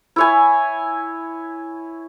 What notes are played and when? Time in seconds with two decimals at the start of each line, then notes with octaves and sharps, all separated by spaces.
0.16 E4 C#5 G#5